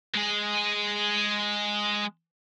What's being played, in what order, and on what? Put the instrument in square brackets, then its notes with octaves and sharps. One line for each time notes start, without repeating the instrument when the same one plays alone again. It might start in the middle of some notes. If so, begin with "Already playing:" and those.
[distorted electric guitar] G#3 G#4